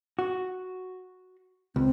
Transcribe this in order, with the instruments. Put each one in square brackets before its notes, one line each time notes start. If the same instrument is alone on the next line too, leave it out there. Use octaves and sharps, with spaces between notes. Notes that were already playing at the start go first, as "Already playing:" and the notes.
[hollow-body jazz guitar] F#4
[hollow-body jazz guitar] C#2 [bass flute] C4